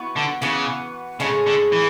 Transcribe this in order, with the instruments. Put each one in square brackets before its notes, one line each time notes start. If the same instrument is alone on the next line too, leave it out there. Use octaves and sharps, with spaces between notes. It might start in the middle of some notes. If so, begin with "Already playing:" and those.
Already playing: [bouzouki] E3 B3 F#4 B4
[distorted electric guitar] D3
[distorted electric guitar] C#3 [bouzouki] E3 B3 F#4 B4
[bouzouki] A2 G#3 C#4 G#4 [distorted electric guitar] C#3
[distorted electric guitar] D3
E3